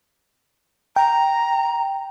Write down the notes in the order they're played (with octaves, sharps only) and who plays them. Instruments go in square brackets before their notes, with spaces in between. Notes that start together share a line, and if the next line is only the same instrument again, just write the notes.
[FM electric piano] G5 [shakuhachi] A#5